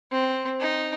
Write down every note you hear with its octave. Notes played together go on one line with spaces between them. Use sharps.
C4
D#4